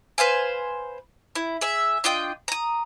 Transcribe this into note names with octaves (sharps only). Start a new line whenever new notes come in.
B4 C5 F5 G#5
E4
G#4 E5
D4 F4 D#5 G5
A#5 D#6